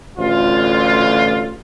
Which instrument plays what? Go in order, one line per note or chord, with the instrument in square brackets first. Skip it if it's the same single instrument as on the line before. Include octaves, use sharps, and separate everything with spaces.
[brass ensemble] A1 D2 F4